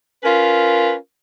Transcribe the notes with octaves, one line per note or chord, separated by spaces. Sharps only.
C#4 F4 A#4 B4